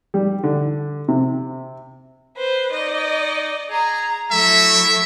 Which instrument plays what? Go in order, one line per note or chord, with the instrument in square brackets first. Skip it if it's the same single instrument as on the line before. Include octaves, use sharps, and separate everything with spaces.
[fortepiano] G3
D3
C3
[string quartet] B4 C5
[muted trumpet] D#4 [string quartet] D5 D#5
[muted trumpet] G#4 [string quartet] A#5
[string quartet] F#3 A3 E4 [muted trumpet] E5